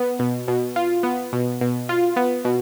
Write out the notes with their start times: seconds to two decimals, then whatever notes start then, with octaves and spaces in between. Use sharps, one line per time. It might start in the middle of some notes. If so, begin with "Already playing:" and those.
Already playing: B3
0.19 B2
0.48 B2
0.76 F4
1.03 B3
1.33 B2
1.61 B2
1.89 F4
2.16 B3
2.45 B2